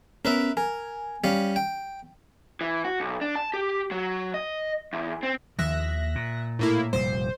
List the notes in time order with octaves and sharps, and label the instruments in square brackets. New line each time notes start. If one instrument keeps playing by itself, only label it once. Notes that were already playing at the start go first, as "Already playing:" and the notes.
[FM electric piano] B3 C#4 [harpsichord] A#4 B4 E5
[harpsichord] A#4 [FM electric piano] G#5
[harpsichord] G3 C#4 F5
G5
[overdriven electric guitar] E3
F#4
B1
D4
A5
G4
F#3
D#5
E2
C4
[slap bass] D#2 D#3 F3 [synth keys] E5 F#6 A#6
[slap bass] A#2
[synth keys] A2 A#3 E4
[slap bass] F1 A#2 G3 [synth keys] C5